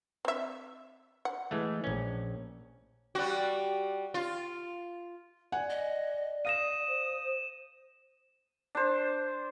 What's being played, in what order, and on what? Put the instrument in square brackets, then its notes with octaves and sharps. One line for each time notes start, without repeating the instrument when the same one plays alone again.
[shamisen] C4 E5
F#5
[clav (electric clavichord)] E3 G#3 A3
A#1 C#4
[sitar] G3 F#4
F4
[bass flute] D5 [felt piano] F#5 G#5
[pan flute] D#5
[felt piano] F5 A#6 [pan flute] D#6 [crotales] D#7 E7
[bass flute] C5
[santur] D4 C5